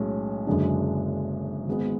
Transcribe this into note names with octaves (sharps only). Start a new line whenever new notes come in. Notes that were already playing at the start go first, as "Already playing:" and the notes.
Already playing: B1 A2 G#3 C#4
F#1 F#2 D3 G#3 D4
G#1 G#2 G#3 B3